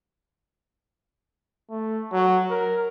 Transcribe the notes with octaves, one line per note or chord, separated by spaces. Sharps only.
A3
F#3
A#4